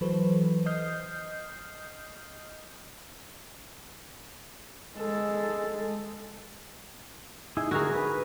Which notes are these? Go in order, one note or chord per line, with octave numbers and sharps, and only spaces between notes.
E3 F#3 E4 A4 B4 C5
D#5 D#6 F6 G6 C7
G#3 A4
D#4 E4 G#4
D3 F#4 G#4 A#4 A#5
B4